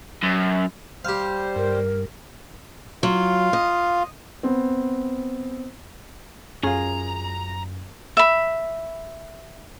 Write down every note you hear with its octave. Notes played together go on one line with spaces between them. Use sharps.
F#2
G3 G4 C5 F5
G2 A#4
F#3 F4 F5
D#5
B3 C4
F#2 C#4 F4 G#4 A#5
E5 B5